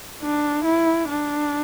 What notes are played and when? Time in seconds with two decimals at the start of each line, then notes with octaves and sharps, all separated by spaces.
0.22 D4
0.65 E4
1.09 D4